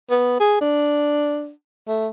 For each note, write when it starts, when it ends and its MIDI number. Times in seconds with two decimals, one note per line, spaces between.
0.10 0.37 59
0.40 0.57 68
0.61 1.51 62
1.88 2.09 57